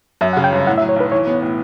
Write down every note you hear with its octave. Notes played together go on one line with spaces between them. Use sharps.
F#2 E5
F#5
C#3
G5
G1
A2 F#5
E5
F#3
C#5
B1 B4
E3 C#5
B3
A2